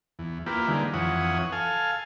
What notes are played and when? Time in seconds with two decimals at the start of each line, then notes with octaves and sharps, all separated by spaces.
0.19 E2
0.46 A#3 E4 F4 G4 B4
0.68 D3 D#3 G3 G#3 A#3
0.94 F2 E3 C#5 F#5 D#6
1.52 A4 F5 G#5